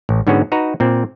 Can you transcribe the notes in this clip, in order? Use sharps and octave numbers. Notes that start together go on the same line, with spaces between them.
A1
G#2 D3 B3 C#4 F#4 G#4
D#4 F#4 B4 A#5
A#2 C4